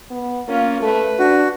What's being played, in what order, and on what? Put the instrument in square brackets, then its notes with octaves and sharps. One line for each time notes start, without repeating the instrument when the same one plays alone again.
[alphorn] B3
[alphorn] A#3 [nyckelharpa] C#4 F4
[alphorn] A3 [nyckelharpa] B4
[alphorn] D4 [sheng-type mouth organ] F#4